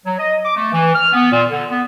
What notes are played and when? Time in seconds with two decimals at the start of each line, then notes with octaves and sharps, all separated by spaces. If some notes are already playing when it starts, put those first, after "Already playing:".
0.06 F#3
0.18 D#5
0.44 D6
0.56 A3
0.72 E3
0.94 F6
1.13 B3
1.32 A#2
1.50 D3
1.71 B3